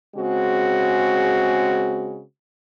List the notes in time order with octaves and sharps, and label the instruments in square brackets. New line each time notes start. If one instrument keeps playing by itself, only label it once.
[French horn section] C#3 G#3 C4 F#4